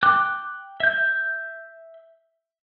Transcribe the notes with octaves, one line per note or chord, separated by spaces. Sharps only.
G5 D6 F#6
E5 G6